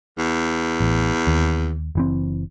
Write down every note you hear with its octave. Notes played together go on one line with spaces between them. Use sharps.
E2
A1
D#2
F#1 E3 C4